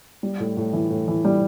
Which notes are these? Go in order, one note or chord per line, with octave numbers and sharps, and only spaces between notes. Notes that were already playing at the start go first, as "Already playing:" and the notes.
G3
A2
A2
E3
A2
E3
G3